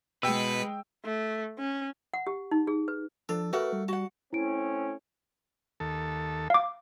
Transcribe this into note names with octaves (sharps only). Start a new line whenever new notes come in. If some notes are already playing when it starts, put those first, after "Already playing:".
B2 G#3 B4 G5 E6 B6 C#7
A3
C#4
F#5
G4
D#4
G#4
B4
F3 D4 A4
A3 F#4 A#4 B4 F#5
G3
F#4 F#5 A5
A3 C4 C#4 E4 D7
D#2 A4
F5 D6